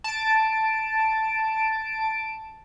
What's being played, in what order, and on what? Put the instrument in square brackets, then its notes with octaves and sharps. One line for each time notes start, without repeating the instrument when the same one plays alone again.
[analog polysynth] A5 D7